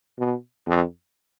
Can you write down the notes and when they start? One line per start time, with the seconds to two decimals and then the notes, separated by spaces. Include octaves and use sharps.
0.19 B2
0.67 F2